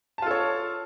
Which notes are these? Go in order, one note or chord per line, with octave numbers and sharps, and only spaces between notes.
F4 A4 C#5 A5